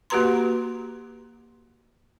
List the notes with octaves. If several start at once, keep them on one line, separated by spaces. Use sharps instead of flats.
A#3 F#4 G4 B4 A#5 C6